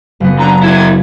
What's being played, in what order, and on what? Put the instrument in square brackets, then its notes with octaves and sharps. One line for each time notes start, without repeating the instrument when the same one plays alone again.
[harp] F#1 B3
[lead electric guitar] D3 [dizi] A#5
[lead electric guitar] B2 E4 [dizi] G#6